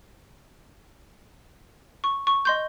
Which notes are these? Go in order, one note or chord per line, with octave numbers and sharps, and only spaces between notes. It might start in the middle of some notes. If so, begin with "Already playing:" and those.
C#6
C#6
D#5 C6 G6